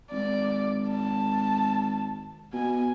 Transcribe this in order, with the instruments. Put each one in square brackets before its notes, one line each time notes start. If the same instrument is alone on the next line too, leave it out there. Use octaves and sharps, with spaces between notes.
[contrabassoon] G#1 [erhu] D5
[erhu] A5
[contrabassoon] B2 [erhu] G#5